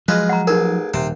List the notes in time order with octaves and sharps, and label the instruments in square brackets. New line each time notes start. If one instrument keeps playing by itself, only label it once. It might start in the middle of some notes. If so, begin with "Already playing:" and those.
[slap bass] F3 F#3 [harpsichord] G#3 F4 B4
[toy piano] F#5 A#5
[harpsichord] A1 G#4 [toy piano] D#4 A#4
[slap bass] D#1 [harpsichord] C3 C5